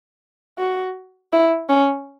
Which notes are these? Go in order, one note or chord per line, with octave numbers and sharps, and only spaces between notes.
F#4
E4
C#4